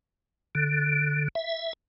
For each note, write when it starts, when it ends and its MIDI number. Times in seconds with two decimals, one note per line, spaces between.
0.55 1.28 50
1.35 1.73 76